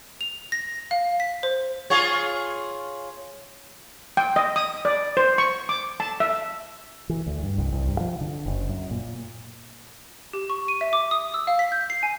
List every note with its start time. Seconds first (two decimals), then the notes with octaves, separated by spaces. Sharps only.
0.21 F7
0.52 A#6
0.91 F5
1.20 B6
1.43 C5
1.90 F4 G#4 C#5
4.17 G5
4.36 D#5
4.56 D#6
4.85 D5
5.17 C5
5.38 C#6
5.69 D6
6.00 A5
6.20 E5
7.09 E3
7.26 D2
7.43 G2
7.58 C2
7.72 C2
7.88 G2
8.00 F3
8.21 D3
8.46 F#1
8.69 F#2
8.91 A#2
10.33 G4
10.50 C#6
10.68 D#7
10.81 E5
10.93 D6
11.11 D#6
11.34 E6
11.47 F5
11.59 B6
11.72 G6
11.90 C7
12.03 G#5